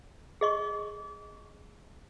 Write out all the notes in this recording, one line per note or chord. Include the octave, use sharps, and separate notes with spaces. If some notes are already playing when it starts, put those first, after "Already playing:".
G#4 D#5 C#6